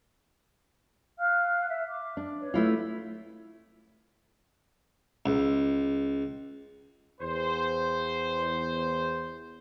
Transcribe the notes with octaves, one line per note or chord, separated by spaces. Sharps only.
F5 F6 F#6
E5
D6
D4
B4 C#5
A3 E4 F4
C#2
E2 C5